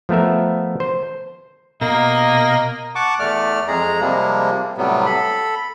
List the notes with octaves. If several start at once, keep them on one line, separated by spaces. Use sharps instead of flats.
F3 A3 B3 A#4 E5
C5
B2 A#3 D#5 A#5
F#5 A5 C#6 D6
E2 A3 D5 F6
F2 G#3 G#4 A#5
C3 F3 G3 G#3 A#3
A2 C3 F#3 G3 B3
A4 B5